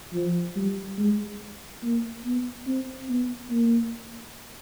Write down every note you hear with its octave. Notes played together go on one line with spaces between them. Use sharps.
F3
G3
G#3
A#3
B3
C4
B3
A#3